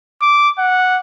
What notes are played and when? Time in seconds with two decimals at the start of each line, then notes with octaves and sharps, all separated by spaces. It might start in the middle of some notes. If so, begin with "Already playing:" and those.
0.22 D6
0.59 F#5